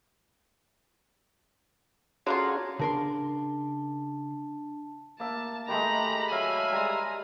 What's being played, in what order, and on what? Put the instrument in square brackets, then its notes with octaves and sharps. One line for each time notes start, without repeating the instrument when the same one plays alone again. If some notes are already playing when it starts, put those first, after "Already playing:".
[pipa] D3 A#3 F4 [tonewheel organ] C#4 F#4 G#4
[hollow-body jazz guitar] C#3 A#4 C6 [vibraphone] D4 A5
[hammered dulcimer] A#3 E5 [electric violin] A5
[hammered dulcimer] D#3 G#3 A3 [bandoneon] G4 [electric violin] A#5 [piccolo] B5
[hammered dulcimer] F#3 [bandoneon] E5 F5 [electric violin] G#5
[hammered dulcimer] G3 G#3 [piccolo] A#5